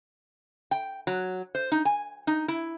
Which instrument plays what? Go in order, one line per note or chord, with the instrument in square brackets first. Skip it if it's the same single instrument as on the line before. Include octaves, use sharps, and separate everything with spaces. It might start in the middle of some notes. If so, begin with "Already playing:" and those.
[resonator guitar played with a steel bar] G5
F#3
C5
D#4
G#5
D#4
E4